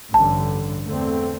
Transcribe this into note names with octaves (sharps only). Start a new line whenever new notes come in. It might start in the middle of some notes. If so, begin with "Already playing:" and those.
A1 G2 D3 A5
E2 D3 A3 C4